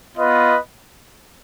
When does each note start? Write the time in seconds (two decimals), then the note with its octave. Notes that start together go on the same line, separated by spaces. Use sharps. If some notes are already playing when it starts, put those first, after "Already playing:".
0.17 B3 F4 B4 D#5